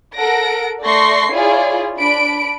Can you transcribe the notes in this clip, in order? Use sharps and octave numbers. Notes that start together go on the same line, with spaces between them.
A4 A#4 F#5 A#6 D7
A3 D5 C6 C#6 A#6 C7
E4 F4 G#4 C#5 D5
D4 B5 D7